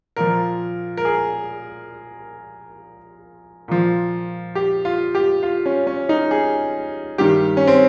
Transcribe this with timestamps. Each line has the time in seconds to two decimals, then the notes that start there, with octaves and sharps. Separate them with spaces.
0.16 A#2 F3 A#4
0.97 A#4
1.05 G#4
3.68 A#2 F3
4.55 G4
4.85 F4
5.15 G4
5.43 F4
5.66 C#4
5.87 C#4
6.09 D#4
6.31 G#4
7.18 G2 D#3 G4
7.57 C#4
7.67 C4